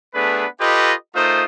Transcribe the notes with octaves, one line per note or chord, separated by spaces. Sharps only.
A3 B3 D4 G#4 B4
F4 G4 A4 B4 D#5
A3 D#4 F4 A#4 C5 D#6